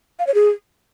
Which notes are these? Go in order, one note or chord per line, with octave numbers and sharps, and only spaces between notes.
F5
C#5
G#4